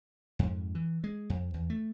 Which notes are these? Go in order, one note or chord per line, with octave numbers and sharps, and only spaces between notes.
F2 G#2
E3
G#3
F2
E2
A3